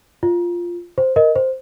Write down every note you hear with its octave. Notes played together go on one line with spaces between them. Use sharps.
F4
C5
A#4 D#5
C5